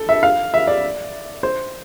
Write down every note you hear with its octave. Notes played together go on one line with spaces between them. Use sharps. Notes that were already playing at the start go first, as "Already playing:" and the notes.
Already playing: A4
E5
F5
E5
D5
C5